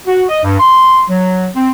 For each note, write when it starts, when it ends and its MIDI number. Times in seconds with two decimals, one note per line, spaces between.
0.07 0.24 66
0.29 0.40 75
0.44 0.59 43
0.60 1.02 84
1.09 1.48 54
1.55 1.70 60